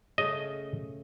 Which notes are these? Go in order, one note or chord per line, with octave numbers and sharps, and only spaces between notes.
C#3 A3 D#5